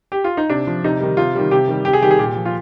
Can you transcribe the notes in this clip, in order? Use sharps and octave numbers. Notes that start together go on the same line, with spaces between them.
G4
F4
D#4
C3 D4
F3
C3 D#4
D#3 G3
C3 F4
D#3 G3
C3 G4
D#3 G3
C3 G4
G#4
D#3 G3 G4
G#4
A#2 G4
F3
F4